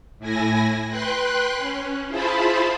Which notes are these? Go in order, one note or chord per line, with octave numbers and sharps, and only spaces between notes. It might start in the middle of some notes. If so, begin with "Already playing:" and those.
A2 E4 G#5 A#6
B4 G5 C6 F#6
C#4
E4 F4 G#4 C5 A5 B5